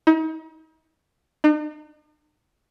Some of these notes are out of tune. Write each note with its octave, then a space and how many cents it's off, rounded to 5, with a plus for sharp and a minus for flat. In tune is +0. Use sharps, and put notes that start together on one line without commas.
D#4 +40
D#4 -45